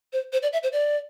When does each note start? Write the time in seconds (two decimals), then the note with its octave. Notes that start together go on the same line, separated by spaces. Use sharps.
0.13 C5
0.33 C5
0.43 D5
0.53 E5
0.63 C5
0.72 D5